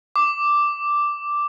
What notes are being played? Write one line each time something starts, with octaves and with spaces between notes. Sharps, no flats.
D6